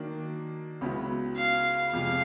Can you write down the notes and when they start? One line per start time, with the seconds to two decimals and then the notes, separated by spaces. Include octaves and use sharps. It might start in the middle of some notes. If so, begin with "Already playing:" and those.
Already playing: D#3 F#3 A#3 D4
0.81 C#2 C#3 F#3 B3 E4
1.37 F5
1.93 F2 C3 F3 G#3 F5